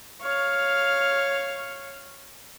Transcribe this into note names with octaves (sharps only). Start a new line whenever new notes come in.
C#5 F5 F6